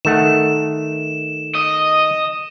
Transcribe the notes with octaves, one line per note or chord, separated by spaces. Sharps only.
D#3 A3 F#5 E7
D#5